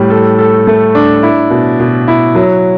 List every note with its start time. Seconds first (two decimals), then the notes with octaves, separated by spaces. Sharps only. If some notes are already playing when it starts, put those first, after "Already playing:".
Already playing: A2 G3
0.10 A4
0.39 A4
0.67 A3
0.95 D4
1.23 E4
1.50 B2
1.80 B2
2.08 E4
2.35 F#3